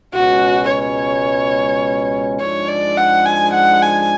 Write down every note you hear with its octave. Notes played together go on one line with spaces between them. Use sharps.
C#2 B2 G#3 C#4 F#4
C#5
G#2 F3 G#3 D4 C#5
D5
F#5
G#5
F#5
G#5